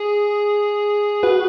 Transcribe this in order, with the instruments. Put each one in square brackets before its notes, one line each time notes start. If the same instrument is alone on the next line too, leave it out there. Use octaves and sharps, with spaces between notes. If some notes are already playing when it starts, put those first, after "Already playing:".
Already playing: [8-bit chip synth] G#4
[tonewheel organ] F#4 [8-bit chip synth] B4